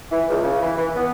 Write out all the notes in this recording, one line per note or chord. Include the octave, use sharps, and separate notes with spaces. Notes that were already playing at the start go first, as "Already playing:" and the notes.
E3
C#2
C#3
E3
E3
B3